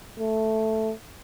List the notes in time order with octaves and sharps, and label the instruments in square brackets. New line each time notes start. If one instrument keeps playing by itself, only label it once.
[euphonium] A3